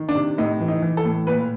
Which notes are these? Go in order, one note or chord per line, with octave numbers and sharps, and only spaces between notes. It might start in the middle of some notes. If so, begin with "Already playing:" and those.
Already playing: D#3
D4
C3
A2 D#4
E3
D#4
E3
A4
A2
A#2 B4